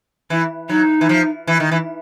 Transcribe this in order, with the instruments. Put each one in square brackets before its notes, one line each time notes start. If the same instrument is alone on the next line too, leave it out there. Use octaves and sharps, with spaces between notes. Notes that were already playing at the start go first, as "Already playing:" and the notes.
[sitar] E3 [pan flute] E4
[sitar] F#3 [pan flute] D#4
[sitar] E3
F3
E3
D#3
E3